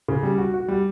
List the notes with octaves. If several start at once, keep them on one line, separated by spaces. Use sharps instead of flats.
C#3
G3
F#4
F#4
G3